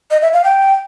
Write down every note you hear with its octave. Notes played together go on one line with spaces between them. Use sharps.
D#5
E5
F5
G5